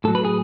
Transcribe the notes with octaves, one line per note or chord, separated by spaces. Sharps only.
A2 F#3 A4
B4
G#4